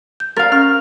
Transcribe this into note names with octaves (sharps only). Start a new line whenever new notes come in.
G6
A#4 F5 A6
C#4 F6